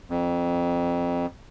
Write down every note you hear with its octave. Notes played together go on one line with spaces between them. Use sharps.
F2